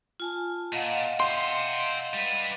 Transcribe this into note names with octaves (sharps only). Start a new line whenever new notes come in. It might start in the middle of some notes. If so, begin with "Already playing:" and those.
F4 G#5 A5
A#2 D#5 F5 F#5
E5 G5 C6
G3 B4